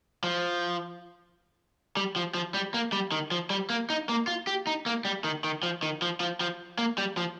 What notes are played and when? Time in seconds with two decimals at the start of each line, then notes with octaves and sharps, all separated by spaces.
0.24 F3
1.97 G3
2.16 F3
2.34 F3
2.54 G3
2.74 A#3
2.92 G3
3.12 D#3
3.31 F3
3.50 G3
3.70 A#3
3.90 D#4
4.09 A#3
4.27 F4
4.47 G4
4.67 D#4
4.86 A#3
5.05 G3
5.24 D#3
5.44 D#3
5.63 F3
5.83 D#3
6.02 F3
6.20 F3
6.41 F3
6.78 A#3
6.98 G3
7.17 F3